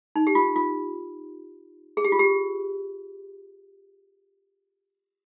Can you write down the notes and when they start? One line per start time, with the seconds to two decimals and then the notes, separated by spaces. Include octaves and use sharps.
0.16 D#4
0.27 G4
0.35 F4
0.56 F4
1.97 G#4
2.05 G4
2.12 F4
2.19 G4